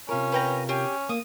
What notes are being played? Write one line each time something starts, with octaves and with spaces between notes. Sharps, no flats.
C3 C#4 F4 A#4
B4 G5 A#5
C#4 G4 G#4
A#3 D#6